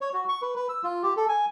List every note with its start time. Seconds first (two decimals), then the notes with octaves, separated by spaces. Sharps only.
0.01 C#5
0.13 F#4
0.29 C#6
0.42 B4
0.56 B4
0.69 E6
0.83 F4
1.03 G4
1.17 A4
1.28 G#5